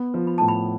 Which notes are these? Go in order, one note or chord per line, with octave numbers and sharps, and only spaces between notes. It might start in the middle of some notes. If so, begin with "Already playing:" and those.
Already playing: B3
F3
B5
A2 A5
B5